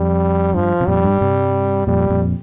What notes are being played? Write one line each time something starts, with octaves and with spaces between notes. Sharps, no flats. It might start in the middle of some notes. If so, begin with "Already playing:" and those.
Already playing: F2 G3
G2 F3
C3
F2 A#2 G3
G2
G2 C3
F2 A#2 G3
F2 A#2